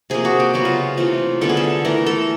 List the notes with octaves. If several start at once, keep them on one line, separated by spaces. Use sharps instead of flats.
C3 F3 A#3 G#4
F#4
G4
C#3 F#3 B3 F#4
F4
C3 E3 A3 F4
D3 G3 B3 A4
G#4
A4
E3 A3 A#4
A4